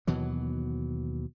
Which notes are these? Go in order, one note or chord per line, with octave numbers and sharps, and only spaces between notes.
D#2 B2 E3 F#3